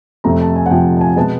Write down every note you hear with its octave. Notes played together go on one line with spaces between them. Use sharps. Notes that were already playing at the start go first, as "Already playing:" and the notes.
F2 C3 F3 A3 A#5
A5
G#5
F#5
F2 C3 F3 A3 G5
A5
G#5
B2 G#3 B3 A5